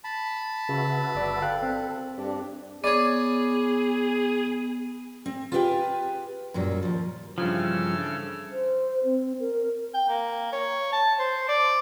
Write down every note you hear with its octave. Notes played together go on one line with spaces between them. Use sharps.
A5 B5
C#3 F#4 B4 E5
G1 D5
A4 F5 G5 F#6
C4
G2 D4 G4
B3 G#4 C#5 D5
C4
F4 G4 G#4 B4 E5 G5
F#2 A#2 F#3 G3
D#2 F3
G2 C#3 E3 F3 A4
C5
C4
A#4
G5
A#3
C#5
A5
C5
D5